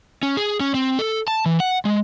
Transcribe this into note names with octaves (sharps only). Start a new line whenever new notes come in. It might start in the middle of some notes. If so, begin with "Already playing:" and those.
C#4
G#4
C#4
C4
A4
A5
E3
F#5
G#3